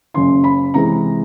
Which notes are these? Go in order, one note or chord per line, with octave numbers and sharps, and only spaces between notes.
F#1 F#2 C#3 C6
B5
C3 E3 G#3 A#5